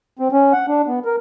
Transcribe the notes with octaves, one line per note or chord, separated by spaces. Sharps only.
C4
C#4
F#5
D4
B3
A#4